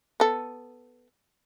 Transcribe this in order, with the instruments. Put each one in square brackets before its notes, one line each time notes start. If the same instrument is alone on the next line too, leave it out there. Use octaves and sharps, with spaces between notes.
[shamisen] B3 A4